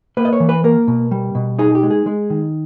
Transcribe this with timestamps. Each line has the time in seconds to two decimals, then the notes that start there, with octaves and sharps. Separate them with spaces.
0.17 A#3 B4
0.25 D#5
0.33 C#5
0.40 E3
0.49 B4
0.64 A#3 A#4
0.88 B2
1.11 G3
1.35 B2
1.59 D#4 G#4
1.75 G4
1.83 G#3
1.91 G#4
2.06 G#3
2.30 D#3